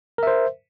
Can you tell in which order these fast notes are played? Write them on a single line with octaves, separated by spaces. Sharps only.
A#4 E5 C5